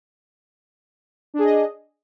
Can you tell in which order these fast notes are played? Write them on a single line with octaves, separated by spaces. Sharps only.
D4 G#4 D#5